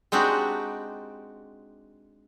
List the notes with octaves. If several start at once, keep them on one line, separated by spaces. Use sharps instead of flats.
G#3 C4 D4 D#4 F#4 G4